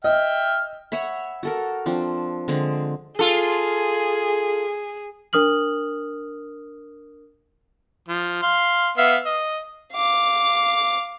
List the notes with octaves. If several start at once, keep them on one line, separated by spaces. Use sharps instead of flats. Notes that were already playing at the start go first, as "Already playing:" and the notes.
D#5 E5 G5 F6
C#5 E5 F#5 B5
F#4 A4 A#4
F3 C4 D4
D3 G#3 C4
F4 G#4 A4
D4 A#4 D#6 F6 F#7
F3
F5 C6
B3 E5 F5
D#5
F5 D6